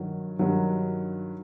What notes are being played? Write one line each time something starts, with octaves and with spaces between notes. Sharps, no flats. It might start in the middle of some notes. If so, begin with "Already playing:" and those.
Already playing: G2 D#3 F#3
G2 D#3 F#3